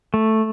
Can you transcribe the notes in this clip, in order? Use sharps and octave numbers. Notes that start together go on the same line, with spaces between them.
A3